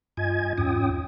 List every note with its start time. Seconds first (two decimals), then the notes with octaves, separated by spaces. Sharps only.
0.17 G2 F4 D#5 G#5 G#6
0.58 E2 G#2 C#4 F4 G5 D#6